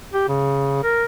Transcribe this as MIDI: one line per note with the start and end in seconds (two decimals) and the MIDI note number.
0.13 0.25 67
0.28 0.83 49
0.84 1.05 70